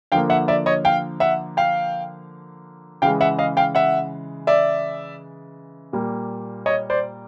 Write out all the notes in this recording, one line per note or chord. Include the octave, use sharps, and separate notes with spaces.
D3 F3 A#3 F5 G5
E5 F#5
D5 E5
C#5 D#5
F5 G5
E5 F#5
F5 G5
C#3 E3 G#3 F5 G5
E5 F#5
D#5 F5
F5 G5
E5 F#5
D5 E5
A#2 G3 A#3
C#5 D#5
C5 D5